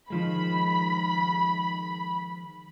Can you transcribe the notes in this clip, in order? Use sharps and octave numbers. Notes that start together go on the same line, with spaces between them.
D#3 F3 G#3 B5